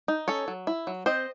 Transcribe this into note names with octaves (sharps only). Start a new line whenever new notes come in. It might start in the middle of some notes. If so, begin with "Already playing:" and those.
D#4
C#4 A4 C#5
F#3
E4
F#3
C4 C5 D#5